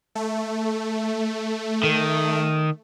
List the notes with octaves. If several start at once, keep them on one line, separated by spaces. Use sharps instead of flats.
A3
D#3